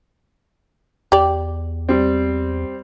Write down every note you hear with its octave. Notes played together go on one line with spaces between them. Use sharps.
E2 G4 D5
G3 C4